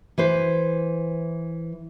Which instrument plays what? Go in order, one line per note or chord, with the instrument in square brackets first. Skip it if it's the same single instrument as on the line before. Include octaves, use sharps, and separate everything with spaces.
[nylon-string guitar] E3 B4 C5